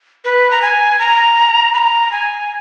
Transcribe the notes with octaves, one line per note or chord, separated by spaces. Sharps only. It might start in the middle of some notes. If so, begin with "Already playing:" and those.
B4
A#5
G#5
A#5
B5
A#5
G#5